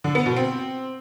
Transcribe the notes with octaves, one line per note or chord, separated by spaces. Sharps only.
D3
B3
B2
C4